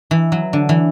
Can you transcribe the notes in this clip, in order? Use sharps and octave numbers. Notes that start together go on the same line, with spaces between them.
E3
F#3
D3
E3